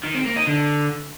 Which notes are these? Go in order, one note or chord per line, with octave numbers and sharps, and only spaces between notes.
D#3
C4
A#3
D#4
D3